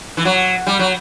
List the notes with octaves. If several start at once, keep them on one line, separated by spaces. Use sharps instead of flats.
E3
F#3
G3
F#3